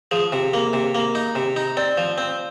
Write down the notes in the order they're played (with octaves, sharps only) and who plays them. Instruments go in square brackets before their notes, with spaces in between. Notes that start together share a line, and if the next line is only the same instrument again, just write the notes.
[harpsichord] F3 [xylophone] G#4
[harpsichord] C3
A#3
C3
A#3
D#4
C3
D#4
[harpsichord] C4 [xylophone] D5
[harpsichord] F3
C4